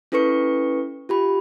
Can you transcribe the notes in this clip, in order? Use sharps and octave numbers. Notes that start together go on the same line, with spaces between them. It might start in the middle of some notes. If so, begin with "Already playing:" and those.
C#4 E4 A4 B4 C#6 C#7
F4 G4 B5